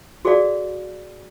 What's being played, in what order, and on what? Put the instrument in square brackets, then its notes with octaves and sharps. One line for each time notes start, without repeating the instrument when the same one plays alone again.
[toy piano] F#4 G#4 A4 C#5 D5 F5